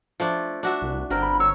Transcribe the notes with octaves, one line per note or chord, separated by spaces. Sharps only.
F3 A3 D4
D4 F#4 E5
C2
G1 D3 C4 A#4
B5
C#5 E6